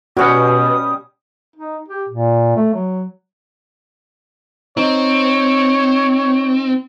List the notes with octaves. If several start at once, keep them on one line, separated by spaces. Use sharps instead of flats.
B2 G3 C#4 F#4 G4 D#6
D#4
G4
A#2
A3
F#3
C4 D#4 C#5